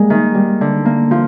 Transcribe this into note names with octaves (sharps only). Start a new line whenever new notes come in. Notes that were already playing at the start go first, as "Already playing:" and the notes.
Already playing: G3 G#3 A#3
D#3
G3
D3
A#3
F3